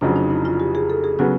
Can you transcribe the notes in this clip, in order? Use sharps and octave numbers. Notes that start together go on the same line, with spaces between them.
F1 F2 C#3 F#3 D4
D#4
E4
F4
G4
G#4
A4
G#4
C#3 F#3 B3 F#4